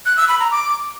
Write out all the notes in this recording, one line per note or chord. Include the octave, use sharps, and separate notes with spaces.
F#6
E6
B5
A#5
D6